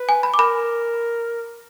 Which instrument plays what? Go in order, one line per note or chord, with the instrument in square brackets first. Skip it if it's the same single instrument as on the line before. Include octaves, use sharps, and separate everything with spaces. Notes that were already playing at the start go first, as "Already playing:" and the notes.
Already playing: [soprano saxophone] B4
[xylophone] G#5
B5
D6
[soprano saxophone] A#4 [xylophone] B5